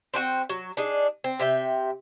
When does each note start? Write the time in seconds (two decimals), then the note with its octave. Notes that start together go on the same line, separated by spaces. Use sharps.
0.14 C4 D4 F#4 G5
0.49 F#3
0.77 D4 D#4 G#4
1.24 C4
1.40 C3 E5 G5